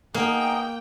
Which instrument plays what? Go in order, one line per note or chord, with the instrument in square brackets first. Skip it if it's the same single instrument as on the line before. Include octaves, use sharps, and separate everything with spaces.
[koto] A#3 [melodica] B3 D#4 G#4 [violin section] G5